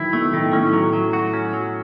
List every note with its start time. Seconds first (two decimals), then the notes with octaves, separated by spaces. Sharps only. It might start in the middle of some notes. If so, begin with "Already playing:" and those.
Already playing: D#3 E3 F#3 E4
0.13 B2 A3
0.33 A2 D#3
0.53 A2 C#4
0.73 F#3
0.93 F#3
1.13 F#4
1.33 C#4
1.53 F#3